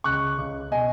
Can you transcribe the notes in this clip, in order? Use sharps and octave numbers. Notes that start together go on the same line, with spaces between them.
C#2 C#3 C#6 F#6
C#2 C#3
B2 D#5 G#5